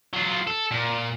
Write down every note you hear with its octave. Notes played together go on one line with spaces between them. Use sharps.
F#3 F4
A4
A#2